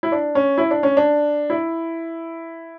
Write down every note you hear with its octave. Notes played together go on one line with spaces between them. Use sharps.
E4
D4
C#4
E4
D4
C#4
D4
E4